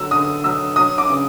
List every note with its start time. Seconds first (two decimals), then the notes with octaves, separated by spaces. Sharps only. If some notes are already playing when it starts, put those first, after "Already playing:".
Already playing: D3 F#3 E6
0.11 D3 D#6
0.44 F#3 E6
0.76 F#3 D#6
0.98 D6
1.10 C#3